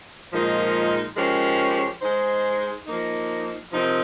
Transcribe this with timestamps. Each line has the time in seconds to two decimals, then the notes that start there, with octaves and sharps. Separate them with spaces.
0.31 A#2 F3 G#3 D#4 A#4
1.17 F3 G#3 C#4 G4 A#4
2.02 G#3 D#4 G#4 C5
2.86 F3 A#3 D#4
3.71 C3 F3 C4 D#4 A#4